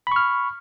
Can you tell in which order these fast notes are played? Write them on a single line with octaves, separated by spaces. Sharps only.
B5 C#6 F6